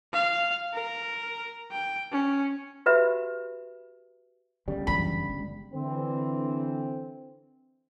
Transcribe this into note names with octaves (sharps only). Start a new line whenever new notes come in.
F5
A#4
G5
C#4
F#4 G4 B4 E5 B5
G1 C2 C#3 G3
F#2 E3 B5
G#3
D3 E3 C4